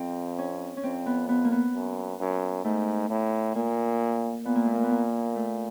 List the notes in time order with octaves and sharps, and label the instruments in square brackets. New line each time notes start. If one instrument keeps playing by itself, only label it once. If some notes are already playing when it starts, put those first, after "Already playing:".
Already playing: [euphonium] F2 [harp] C4
[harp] C#4
C#4
[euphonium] F2 [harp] C4
[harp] B3
B3
A#3
B3
[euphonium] F#2
F#2
[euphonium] G#2 [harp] A3
[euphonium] A2
[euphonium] A#2 [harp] A#3
[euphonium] A#2 [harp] B3
[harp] A#3
A3
A#3
B3
A#3
A3